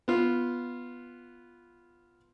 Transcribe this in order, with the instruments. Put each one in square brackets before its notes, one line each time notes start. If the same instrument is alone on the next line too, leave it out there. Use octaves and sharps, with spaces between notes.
[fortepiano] B3 F4